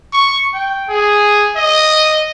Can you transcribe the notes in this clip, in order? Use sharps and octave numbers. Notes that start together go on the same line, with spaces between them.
C#6
G5
G#4
D#5